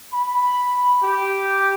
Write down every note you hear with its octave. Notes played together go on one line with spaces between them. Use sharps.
B5
G4